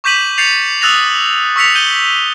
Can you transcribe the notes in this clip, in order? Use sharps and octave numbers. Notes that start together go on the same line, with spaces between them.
C#6 D6 G6 B6 D#7 F#7
G6 A6 C7 C#7 F7
D#6 E6 F#6 A6 A#6 F7
C#6 E6 B6 C#7 F7
G6 D#7 G7